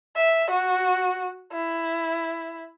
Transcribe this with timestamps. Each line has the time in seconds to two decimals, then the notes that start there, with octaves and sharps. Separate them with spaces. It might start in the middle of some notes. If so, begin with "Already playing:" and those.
0.16 E5
0.50 F#4
1.52 E4